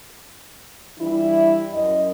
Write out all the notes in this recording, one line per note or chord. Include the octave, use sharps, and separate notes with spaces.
E3 G3 D4 E4
F#2 D#5